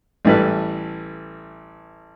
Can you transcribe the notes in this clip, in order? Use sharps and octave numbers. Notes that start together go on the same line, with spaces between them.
A1 E3 G3 A3 B4